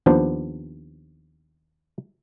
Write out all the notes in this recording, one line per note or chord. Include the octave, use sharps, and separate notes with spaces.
D#2 F3 B3 D4 C5